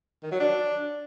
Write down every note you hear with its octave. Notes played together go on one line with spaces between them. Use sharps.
D#3
F#3
D4